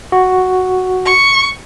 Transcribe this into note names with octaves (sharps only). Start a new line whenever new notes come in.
F#4
C#6